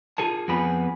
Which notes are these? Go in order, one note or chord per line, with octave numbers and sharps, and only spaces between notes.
F4 G#4 A#4 A5
F2 B3 G#4 B5